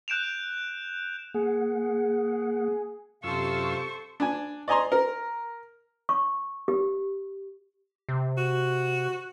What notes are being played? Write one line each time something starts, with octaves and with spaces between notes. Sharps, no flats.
F#6 G6 D7 E7 F7
A#3 G#4 F#5
F#2 C3 F4 A4 C5 F5 C#6 E6
D4 G#5
D5 D#5 G#5 A#5 C6
A#4
C#6
G4
C3
F#4